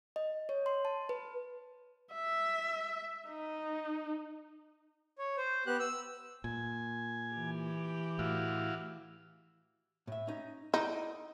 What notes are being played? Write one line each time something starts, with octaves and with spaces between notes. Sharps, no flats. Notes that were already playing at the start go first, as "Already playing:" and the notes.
D#5
C#5
C6
A5
B4
E5
D#4
C#5
C5
B3 G4 F#6
E6
A#2 G#5
E3 G4
A2 E4 F#4 F5
A2 E5
C#4 D#4
D#4 E4 D5 D#5